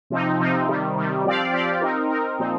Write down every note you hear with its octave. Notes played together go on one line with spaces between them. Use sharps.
C3 F3 C4 D#4
C3 F3 C4 D#4
C3 D#3 G3
C3 D#3 G3
F3 C4 G4 D5 F5
F3 C4 G4 D5 F5
C4 D#4 A#4
C4 D#4 A#4
A#2 F3 C4 D#4